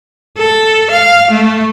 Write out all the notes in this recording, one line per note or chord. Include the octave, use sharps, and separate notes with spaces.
A4
F5
A3